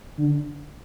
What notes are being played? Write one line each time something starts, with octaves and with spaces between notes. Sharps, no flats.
D3